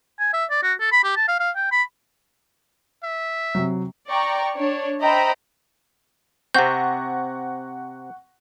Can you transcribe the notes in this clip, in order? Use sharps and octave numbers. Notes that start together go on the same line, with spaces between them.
G#5
E5
D5
F#4
A4
B5
G4
A5
F5
F5
G5
B5
E5
C3 F#3
D5 G5 A#5 C#6
D4 C#5
C5 D#5 E5 G5 A#5 B5
C3 C4 F#5 C#6 G6 A#6